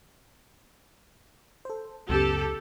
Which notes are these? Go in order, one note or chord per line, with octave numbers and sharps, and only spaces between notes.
A4 C5
C#2 F#2 C#3 B3 G4 A4